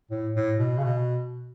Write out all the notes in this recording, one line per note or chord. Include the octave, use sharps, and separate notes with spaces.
A2
A2
B2
C#3
B2